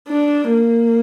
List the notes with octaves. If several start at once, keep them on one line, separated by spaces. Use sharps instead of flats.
D4
A#3